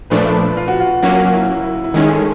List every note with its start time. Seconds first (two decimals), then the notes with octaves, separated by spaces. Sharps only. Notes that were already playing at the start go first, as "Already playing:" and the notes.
0.10 A#2 F3 A3 D4 B4
0.57 F4
0.68 F#4
0.80 F4
1.03 F#3 A#3 C#4 F#4
1.34 E4
1.64 E4
1.84 E4
1.94 D#3 G#3 C#4 D#4
2.08 A4
2.16 G#4